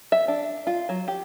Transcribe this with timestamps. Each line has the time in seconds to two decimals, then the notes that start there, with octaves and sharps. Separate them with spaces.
0.12 E5
0.28 D4
0.67 F4
0.89 F#3
1.08 G4